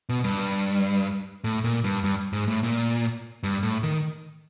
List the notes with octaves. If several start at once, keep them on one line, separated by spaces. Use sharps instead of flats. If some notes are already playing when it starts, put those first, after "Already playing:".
B2
G2
A2
A#2
G2
G2
G#2
A2
A#2
G2
A2
D#3